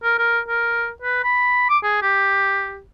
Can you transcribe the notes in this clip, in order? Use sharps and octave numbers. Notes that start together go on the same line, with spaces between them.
A#4
A#4
A#4
B4
B5
D6
G#4
G4